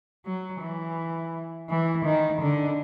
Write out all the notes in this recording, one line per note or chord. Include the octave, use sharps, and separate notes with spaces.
F#3
E3
E3
D#3
D3